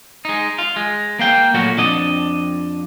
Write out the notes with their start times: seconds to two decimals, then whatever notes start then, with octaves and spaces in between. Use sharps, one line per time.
0.25 G#3 D#4
0.59 F4
0.76 G#3
1.19 A#3 F5 G5
1.54 A#2 F#3 A3 A#3 F#4
1.77 F2 D4 D#5